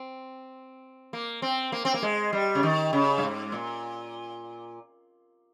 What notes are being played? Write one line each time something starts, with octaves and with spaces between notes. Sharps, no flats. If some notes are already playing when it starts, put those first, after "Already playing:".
Already playing: C4
A#3
C4
A#3
C4
A#3
G#3
G3
C#3
D#3
C#3
G2
G#2
A#2